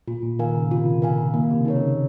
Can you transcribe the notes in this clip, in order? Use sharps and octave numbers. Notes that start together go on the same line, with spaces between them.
A#2 F4
A#2
D#3 A#4 F5 G#5
C#3
C3 F4
A#4 F5 G#5
D#3 A#3
C3
C#3
D#4 A#4 C#5
C#3